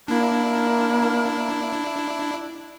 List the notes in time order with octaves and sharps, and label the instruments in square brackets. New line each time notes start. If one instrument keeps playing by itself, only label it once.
[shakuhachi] A#3 [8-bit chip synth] D4 E4